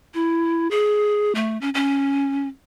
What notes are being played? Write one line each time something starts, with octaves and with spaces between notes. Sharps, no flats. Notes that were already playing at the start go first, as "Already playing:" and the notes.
E4
G#4
A3
C#4
C#4